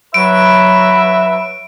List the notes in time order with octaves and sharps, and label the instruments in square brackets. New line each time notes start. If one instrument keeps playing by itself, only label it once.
[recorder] F#3 [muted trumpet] B4 [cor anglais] E5 [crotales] D7